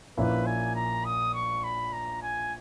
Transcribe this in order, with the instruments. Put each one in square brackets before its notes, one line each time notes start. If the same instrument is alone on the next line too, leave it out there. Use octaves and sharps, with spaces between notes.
[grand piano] A#1 A#2 A#3 C#4 E4 [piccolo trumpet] B4
[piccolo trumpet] G#5
A#5
D#6
C#6
B5
A#5
G#5